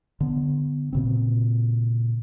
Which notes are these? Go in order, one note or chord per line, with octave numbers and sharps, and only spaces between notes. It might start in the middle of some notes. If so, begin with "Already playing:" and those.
D3 B3
A#2 C#3 C4